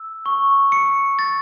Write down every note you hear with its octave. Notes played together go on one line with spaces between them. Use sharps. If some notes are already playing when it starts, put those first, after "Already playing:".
Already playing: E6
C#6
C#7
A6